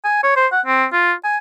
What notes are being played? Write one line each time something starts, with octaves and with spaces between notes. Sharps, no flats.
G#5
C#5
C5
F#5
C4
F4
G#5